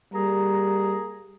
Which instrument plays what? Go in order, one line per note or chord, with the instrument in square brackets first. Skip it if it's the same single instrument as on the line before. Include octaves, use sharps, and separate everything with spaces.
[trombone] G3 [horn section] A#3 G#4 A#5